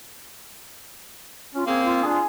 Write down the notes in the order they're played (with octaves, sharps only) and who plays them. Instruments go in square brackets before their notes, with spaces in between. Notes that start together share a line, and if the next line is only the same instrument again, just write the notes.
[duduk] C#4 [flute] F4
[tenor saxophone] A#3 [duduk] C4 [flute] G#4
[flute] F4
[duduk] D4 [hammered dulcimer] G#4